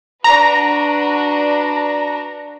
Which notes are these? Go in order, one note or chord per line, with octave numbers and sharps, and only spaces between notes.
D4 F#4 B4 A#5